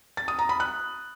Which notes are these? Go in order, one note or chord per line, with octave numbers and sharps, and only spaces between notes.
A6
D#6
A#5
B5
F#6